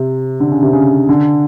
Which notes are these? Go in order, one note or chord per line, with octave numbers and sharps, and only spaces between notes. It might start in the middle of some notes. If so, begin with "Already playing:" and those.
Already playing: C3
D3
C#3
C3
C#3
D3